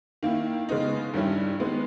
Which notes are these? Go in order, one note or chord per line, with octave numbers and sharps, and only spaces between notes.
D#3 A#3 E4
C#3 G#3 B3 D#4
G2 D#3 G3 C#4 E4
D#3 G#3 B3